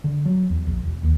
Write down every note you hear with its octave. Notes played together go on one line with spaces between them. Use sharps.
D3
F#3
E2
A#1
E1
D#2